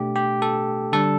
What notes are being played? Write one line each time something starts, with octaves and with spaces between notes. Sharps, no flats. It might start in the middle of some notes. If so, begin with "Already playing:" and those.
Already playing: B2 A3 D4 G4
G4
A4
D3 G3 D4 A4